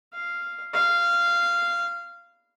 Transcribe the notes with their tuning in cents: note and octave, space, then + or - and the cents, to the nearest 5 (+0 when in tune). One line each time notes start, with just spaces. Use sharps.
F5 -5
F5 -15